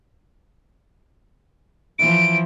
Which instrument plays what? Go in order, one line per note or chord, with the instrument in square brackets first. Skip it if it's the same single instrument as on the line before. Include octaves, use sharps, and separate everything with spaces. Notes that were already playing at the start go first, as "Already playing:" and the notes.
[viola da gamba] E3 F3 [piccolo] D7